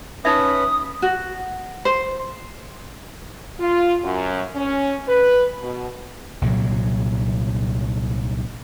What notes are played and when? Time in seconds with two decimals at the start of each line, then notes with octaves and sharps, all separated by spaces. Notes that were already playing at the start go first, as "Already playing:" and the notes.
0.25 C#4 D#4 B4 E5 B5 D#6
1.02 F#4
1.85 C5
3.60 F4
4.04 F#2
4.55 C#4
5.08 B4
5.61 B2
6.42 C2 A#2 C#3 F#3